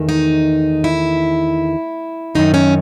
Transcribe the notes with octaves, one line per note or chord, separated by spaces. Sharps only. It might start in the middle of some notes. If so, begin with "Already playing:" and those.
Already playing: E2 D#3 A3
D#4
E4
F#2 D#3 F#3 D#4
C#4